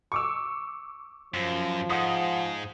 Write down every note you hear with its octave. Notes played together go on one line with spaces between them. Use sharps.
C#6 D6 E6
F#2 F3
G#2 F#5 D#6